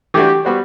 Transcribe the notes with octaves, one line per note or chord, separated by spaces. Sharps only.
E3 A3 D4 F#4 G4
G3 B3 F#4 C5